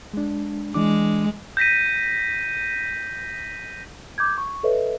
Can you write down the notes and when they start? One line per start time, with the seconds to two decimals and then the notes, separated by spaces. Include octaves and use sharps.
0.13 G#3 D4
0.74 E3 G#3 D4 D6
1.57 G6 A#6 B6 D#7
4.18 D6 G6 G#6
4.38 C#6
4.63 A4 B4 C#5 D#5 E5